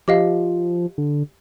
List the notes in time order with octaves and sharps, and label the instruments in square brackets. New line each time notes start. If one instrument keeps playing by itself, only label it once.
[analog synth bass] F3 [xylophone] G4 D#5 F5
[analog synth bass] D3